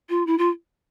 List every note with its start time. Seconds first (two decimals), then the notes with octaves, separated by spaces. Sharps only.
0.09 F4
0.27 E4
0.38 F4